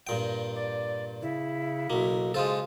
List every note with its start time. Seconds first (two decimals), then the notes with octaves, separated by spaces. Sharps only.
0.07 G2 A#2 G5
0.55 D5
1.22 C#3 E4
1.90 B1 B2 A#3
2.34 C#3 G#3 F4 A4 C5